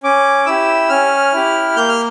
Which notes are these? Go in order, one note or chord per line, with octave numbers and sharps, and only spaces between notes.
C#4 D6
E4 G4 E6
C#4 F6
E4 G4
A#3 G6
F6